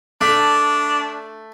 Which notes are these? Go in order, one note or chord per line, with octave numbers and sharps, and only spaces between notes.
A3 D4